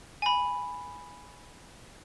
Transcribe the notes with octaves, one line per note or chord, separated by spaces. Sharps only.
G#5 B5